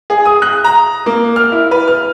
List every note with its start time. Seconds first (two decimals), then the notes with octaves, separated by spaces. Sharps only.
0.10 G#4
0.25 D#6
0.42 F#6
0.64 A#5
1.06 A#3
1.36 F6
1.52 E4
1.71 B4
1.88 F6